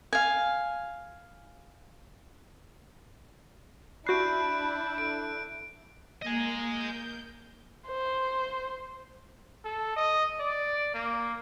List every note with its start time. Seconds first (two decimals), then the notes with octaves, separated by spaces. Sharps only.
0.13 F5 G#5
4.07 D4 E4 F#4 B5 F#6 G6 C7 D7
4.98 A4 D7
6.22 A#3 A#4 D#5 G#5
6.72 G6
7.88 C5
9.65 A4
9.96 D#5
10.40 D5
10.94 A#3